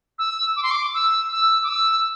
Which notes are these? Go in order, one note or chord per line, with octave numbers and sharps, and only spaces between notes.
E6
D6
C6
D6
E6
E6
D6
E6